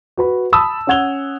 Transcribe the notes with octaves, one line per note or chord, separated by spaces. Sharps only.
F#4 B4 B5
A5 B5 D#6 E6
C#4 C#5 F#5 G#6 F7 G7